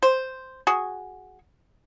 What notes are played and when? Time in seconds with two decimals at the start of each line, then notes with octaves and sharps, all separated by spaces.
0.03 C5
0.67 F#4 G#4